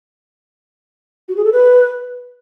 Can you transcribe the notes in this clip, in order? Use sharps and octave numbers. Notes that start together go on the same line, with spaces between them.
F#4
G#4
A4
B4